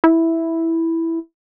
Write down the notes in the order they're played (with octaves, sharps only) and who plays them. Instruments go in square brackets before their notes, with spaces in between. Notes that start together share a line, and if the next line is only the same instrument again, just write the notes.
[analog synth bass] E4